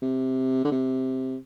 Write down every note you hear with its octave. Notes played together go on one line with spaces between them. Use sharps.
C3
D3
C3